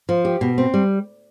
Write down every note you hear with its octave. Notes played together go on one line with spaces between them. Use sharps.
F3
G4
B2
C4
G3